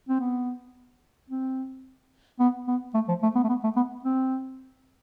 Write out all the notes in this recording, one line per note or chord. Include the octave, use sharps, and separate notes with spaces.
C4
B3
C4
B3
B3
A3
F3
A3
B3
A3
B3
A3
B3
C4